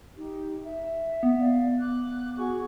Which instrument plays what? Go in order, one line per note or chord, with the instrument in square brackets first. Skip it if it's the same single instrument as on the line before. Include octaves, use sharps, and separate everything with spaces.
[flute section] D#4 G4
E5
[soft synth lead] B3
[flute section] D5 F5
D6 F#6
F#4 G#4 C#6